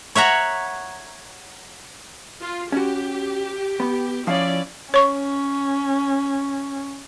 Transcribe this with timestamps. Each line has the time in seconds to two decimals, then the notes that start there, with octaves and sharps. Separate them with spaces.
0.15 C#5 E5 F#5 A#5
2.41 F4
2.72 C#4 F#4 G4
3.80 B3
4.27 F3 C#4 E4 D5 F5
4.94 C#4 C#5 C#6